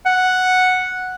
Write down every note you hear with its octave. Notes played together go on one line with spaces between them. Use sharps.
F#5